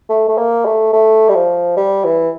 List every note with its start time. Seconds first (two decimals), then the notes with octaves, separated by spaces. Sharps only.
0.09 A3
0.29 A3
0.37 A#3
0.65 A3
0.93 A3
1.29 G3
1.35 F3
1.77 G3
2.04 E3